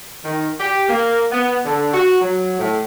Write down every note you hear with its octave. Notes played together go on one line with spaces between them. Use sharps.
D#3
G4
A#3
B3
D3
F#4
F#3
A2